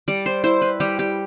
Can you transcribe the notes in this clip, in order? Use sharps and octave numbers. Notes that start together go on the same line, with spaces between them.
G3 D5
C5
E4 C5
B4
G3 G4
G4